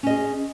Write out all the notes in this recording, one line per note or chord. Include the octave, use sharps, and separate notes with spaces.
C#4 G#4 D#5